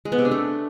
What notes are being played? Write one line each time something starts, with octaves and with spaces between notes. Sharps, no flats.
G#3
B3
C3
D4
A3